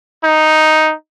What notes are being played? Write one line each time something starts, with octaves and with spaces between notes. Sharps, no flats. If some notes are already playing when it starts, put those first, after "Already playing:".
D#4